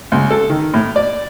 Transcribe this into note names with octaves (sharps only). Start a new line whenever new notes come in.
C#2
A4
D#3
A2
D5